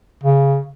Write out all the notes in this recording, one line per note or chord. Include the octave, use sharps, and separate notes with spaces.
C#3